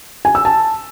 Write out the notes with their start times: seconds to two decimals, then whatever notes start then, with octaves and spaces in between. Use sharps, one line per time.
0.25 G#5
0.35 E6
0.45 A5